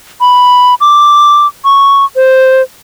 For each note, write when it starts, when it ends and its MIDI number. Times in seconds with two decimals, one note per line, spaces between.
0.21 0.74 83
0.81 1.47 86
1.65 2.05 85
2.16 2.62 72